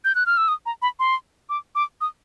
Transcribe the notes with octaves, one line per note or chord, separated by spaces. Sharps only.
G6
F#6
F6
E6
D#6
A#5
B5
C6
D6
D6
D#6